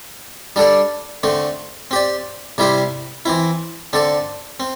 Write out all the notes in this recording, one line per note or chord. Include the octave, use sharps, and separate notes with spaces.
G3 D4 A4 D5
D3 A3 C4
C4 G4 D5
C3 G3 E4 G4 C5
E3 C4 E4
D3 C4 A4 D5
C4